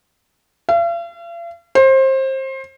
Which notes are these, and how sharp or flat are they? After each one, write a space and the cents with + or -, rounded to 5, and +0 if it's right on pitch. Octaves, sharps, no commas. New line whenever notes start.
F5 -45
C5 +25